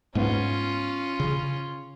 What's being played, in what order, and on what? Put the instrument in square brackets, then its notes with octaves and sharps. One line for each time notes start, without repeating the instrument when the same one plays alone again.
[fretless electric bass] G#2 G#3 B3 [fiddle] C#4 F4
[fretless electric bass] C#3